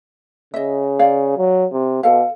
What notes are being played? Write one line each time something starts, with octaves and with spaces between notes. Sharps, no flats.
C#3 D#5 E5
C#5 D5 F5
F#3
C3
B2 A4 F5